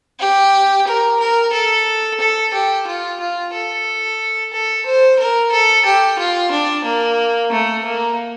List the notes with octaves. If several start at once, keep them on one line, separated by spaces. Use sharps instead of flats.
G4
A#4
A#4
A4
A4
G4
F4
F4
A4
A4
C5
A#4
A4
G4
F4
D4
A#3
A3
A#3